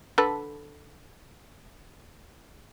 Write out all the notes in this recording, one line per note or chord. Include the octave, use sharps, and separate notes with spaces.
D3 A4 B4